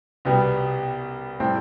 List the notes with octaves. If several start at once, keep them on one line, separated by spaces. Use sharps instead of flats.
C2 B2 G3 B3
A2 G3 C4